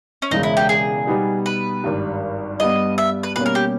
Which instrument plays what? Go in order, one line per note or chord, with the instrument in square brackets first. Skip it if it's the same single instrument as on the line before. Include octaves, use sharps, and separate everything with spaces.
[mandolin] C#4
[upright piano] E1 E2 C#3 G#3 [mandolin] D#4
[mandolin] E4
G4
G#4
[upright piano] B2 G3 B3 D#4 G4
[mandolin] B4
[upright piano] G#1 G2 G3
[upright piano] G2 G3 B3 [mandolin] D#5
[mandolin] E5
B4
[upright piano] B2 G3 A#3 C#4 [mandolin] B4
[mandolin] A#4
G4